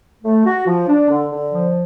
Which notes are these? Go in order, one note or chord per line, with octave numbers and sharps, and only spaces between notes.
A3
F#4
F3
D4
D3
D3
F3